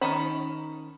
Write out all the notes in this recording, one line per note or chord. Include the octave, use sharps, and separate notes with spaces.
D#3 C#4 D#4 A5 B5